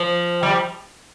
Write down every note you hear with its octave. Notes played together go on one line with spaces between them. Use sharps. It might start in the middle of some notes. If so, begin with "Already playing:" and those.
Already playing: F3
G3